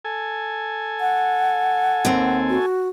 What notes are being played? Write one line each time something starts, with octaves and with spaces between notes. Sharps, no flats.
A4 G#5
F#5
D#2 C4
F#4